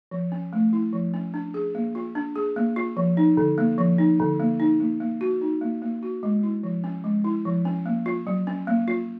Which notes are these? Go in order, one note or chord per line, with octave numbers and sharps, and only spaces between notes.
F3
C#4
A3
E4
F3
C#4
D4
G#4
A#3
F4
D4
G#4
A#3
F4
F3
D#4
D3
A#3
F3
D#4
D3
A#3
D#4
A#3
A#3
F#4
D#4
A#3
A#3
F#4
G#3
E4
F3
C#4
G#3
E4
F3
C#4
A#3
F4
F#3
C#4
A#3
F4